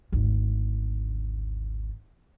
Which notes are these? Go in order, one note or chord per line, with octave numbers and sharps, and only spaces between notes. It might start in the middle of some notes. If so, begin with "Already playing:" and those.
G#1 D2